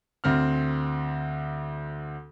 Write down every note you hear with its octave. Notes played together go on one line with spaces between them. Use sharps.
D2 C4 F6